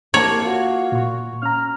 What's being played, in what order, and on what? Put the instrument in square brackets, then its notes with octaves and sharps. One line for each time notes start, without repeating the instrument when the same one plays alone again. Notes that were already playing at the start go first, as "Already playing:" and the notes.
[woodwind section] C2 [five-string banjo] A#3 A5 [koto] C#5
[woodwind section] F4 F#4
[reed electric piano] A#2 C#6
[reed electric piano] C#4 A#5 [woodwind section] F6